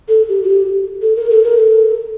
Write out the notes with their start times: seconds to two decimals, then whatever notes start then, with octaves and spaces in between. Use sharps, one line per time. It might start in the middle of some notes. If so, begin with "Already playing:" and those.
0.08 A4
0.29 G4
0.43 F#4
0.49 G4
1.02 A4
1.16 A#4
1.30 A4
1.44 A#4
1.57 A4